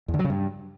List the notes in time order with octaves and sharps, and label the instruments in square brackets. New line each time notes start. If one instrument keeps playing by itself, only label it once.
[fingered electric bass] E2
D3
F#3
C#3
G2